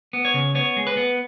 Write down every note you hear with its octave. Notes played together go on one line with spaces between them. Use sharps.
B3
C#5
C#3
B3 C#5
G#3
B4
B3